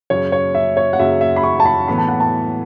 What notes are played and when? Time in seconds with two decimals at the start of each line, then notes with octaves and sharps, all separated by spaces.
0.10 F#2 C#3 F#3 C#5
0.32 C#5
0.55 E5
0.77 C#5
0.93 F#5
0.99 F#2 C#3 F#3 E5
1.21 E5
1.36 B5
1.43 C#6
1.60 A5
1.66 B5
1.88 A2 E3 B3 B5
1.98 A5
2.08 F#5
2.20 A5